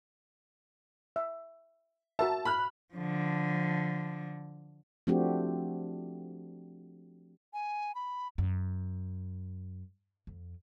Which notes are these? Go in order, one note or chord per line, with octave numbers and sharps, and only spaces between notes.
E5
F#4 A#4 E5 A5
B5 F6 F#6
D3 F3
F3 A3 C4 D4 F#4 G4
G#5
B5
F#2
F2